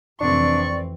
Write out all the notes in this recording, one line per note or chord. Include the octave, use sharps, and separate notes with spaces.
F1 E3 C4 D4 D5 C#6